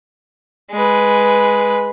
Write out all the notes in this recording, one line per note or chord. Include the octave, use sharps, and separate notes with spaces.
G#3 B4